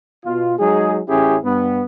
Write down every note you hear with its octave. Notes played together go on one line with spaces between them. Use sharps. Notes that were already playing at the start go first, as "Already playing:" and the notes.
B2 F4
F#3 G#3 D#4 G#4
A1 C#4 E4 G4 G#4
G2 B3